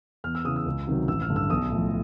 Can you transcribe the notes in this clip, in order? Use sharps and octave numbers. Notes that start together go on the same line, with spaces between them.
E2 F6
E6
C#3 E3 D#6
E6
C#2
C3 D#3 F#3
A1 E6
F6
G2 D3
E6
B1 D#6
A2 F3